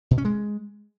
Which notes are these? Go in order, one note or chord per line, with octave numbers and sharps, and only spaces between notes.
B2
C#4
G#3